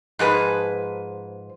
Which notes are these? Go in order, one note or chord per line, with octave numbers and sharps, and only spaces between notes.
G#2 F3 G#4 B4